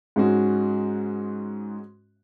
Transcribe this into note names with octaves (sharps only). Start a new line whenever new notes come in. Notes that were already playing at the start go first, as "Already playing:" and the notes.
G#2 G#3 C#4 F#4